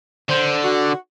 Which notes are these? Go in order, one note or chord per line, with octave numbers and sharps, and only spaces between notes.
D3 C5
F#4